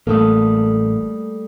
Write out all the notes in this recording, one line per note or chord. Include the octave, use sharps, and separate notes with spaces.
A1 G3 A3 A#3 A4 D#6